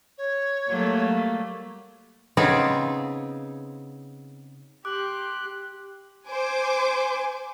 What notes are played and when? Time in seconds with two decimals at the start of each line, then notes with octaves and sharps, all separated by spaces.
0.18 C#5
0.69 F#3 G3 A3 A#3
2.37 C#3 B3 C4 D#4 F4 G#4
4.85 G4 C6 D6 F#6
6.30 C5 G#5 D6